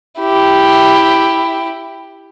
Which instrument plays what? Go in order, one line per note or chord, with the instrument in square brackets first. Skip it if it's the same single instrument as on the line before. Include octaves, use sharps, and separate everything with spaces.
[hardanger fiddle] E4 G4